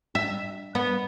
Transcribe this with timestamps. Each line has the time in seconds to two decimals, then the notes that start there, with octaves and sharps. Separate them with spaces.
0.15 E5
0.75 B3